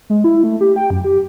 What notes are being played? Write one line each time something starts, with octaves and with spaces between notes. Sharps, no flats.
G#3
E4
A3
G4
G5
F#2
G4